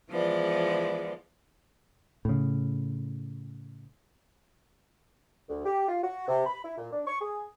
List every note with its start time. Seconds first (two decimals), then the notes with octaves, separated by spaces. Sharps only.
0.10 E3 F3 G#3 B3 D5
2.25 A2 C#3
5.49 D2
5.66 G4
5.88 F4
6.03 F#4
6.28 C3
6.46 B5
6.64 E4
6.78 A#2
6.93 D4
7.07 C#6
7.21 G#4